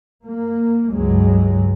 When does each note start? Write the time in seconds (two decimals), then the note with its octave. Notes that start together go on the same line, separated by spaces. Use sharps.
0.24 A#3
0.91 C#2 G2 F#3 G#3